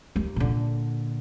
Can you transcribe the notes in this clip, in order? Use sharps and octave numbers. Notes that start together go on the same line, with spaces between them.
D#2
A#2 D3